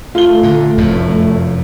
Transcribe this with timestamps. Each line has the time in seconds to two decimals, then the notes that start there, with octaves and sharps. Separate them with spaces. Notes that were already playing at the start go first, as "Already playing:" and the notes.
0.15 A3 F4 G7
0.43 A#2 D3
0.78 F1 F#2 A2